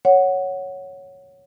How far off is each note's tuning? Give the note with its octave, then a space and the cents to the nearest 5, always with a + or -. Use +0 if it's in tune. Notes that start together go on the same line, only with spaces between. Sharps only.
C#5 +0 F#5 +0